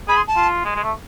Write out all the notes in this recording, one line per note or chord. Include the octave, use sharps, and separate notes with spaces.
G#4 B5
C6
A5
F4
G#3
G#3
A3